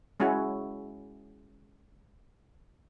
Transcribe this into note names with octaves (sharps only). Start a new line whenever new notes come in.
G#3 C#4 E4 F#4